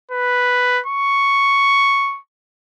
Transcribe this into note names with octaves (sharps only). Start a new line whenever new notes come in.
B4
C#6